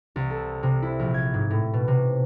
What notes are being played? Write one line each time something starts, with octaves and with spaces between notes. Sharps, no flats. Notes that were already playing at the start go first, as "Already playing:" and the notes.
C2
A4
C3
E4
A#1
G#6
G#2
A2
B2
C3